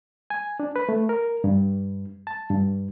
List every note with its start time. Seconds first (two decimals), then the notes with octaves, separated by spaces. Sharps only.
0.30 G#5
0.60 D4
0.76 B4
0.89 A3
1.09 A#4
1.44 G2
2.27 A5
2.50 G2